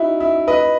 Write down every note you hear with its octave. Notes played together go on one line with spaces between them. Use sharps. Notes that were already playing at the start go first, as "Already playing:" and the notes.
Already playing: D#4 E4 F#4
E4
B4 D#5